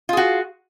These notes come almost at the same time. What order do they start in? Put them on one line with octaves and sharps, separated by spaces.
F4 G#4 F#4